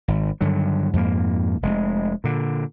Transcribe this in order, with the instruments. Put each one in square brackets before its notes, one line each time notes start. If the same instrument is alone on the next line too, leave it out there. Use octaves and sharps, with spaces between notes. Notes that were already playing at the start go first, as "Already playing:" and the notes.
[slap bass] G#1
G2 D3 D#3 F#3
F2 G#2 G3 A#3
F1 G#3
A#2 D3